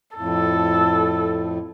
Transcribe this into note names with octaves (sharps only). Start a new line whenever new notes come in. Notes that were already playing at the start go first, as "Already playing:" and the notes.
F2 A2 A4